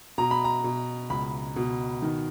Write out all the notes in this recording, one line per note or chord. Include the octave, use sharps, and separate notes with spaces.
B2 A#5
B5
A#5
B2
C#2 B5
B2
D#3